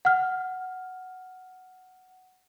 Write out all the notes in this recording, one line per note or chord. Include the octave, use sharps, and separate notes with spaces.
F#5 F6